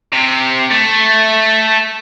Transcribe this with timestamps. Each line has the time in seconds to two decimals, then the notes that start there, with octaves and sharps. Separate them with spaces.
0.13 C3
0.71 A3